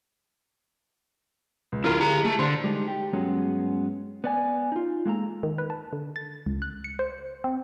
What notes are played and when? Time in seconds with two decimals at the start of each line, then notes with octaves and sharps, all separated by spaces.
1.72 C#2
1.84 D1 E4 F4 A#4 F6
2.01 G4 G#4 A#5
2.25 A3
2.39 D3 C5 C6
2.64 G3 G#3 D#4
2.88 G4
3.13 G2 F#3 G#3 B3 C#4 F#4
4.24 B3 D5 G#5
4.72 D#4 F4
5.06 G#3 A#3 A4 A#5
5.43 D#3
5.58 B4
5.70 A5
5.93 D3
6.16 A6
6.46 C#2
6.62 F#6
6.84 C#7
6.99 C5
7.44 C4